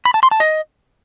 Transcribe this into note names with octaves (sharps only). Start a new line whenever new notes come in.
B5
A5
C6
A5
D#5